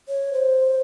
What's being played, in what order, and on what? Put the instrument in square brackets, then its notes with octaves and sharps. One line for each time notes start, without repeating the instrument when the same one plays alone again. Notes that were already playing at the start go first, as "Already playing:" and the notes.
[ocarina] C#5
C5